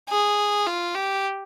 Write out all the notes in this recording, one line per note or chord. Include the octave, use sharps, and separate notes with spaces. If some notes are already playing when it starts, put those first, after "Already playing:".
G#4
F4
G4